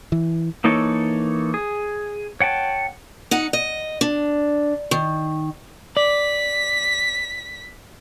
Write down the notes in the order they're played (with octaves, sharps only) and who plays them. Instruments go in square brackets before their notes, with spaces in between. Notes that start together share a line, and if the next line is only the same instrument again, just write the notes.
[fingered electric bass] E3
[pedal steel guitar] E3 A#3 D#4 A4 C#5
G#4
C#5 F#5 G5 A5
[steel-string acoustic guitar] D#4 F#5
D#5
D4
D#3
[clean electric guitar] D5 [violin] B6